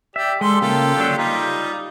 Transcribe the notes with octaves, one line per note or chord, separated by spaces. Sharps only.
G4 D5 E5
G3 G#3 A4 C6
C#3 A#3 F4 G4 A4
D3 F#3 D4
G3 D#4 F4 G4